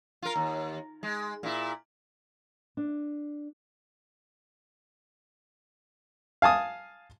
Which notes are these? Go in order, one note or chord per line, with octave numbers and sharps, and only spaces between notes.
F4 A#4
D#2
G#3
A#2 E4
D4
F5 G#5 A5 D#6